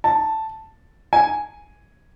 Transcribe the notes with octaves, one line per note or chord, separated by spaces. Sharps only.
A5
G#5